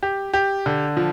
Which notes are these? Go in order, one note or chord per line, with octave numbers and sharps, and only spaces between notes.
G4
G4
D3
F3